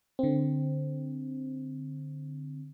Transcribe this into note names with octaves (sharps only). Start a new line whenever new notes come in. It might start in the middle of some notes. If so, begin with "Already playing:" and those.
D3 C4